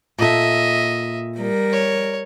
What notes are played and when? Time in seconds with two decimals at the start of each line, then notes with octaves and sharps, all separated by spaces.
0.18 A#2 A4 D#5 E5
1.37 G3 A#4
1.72 C#5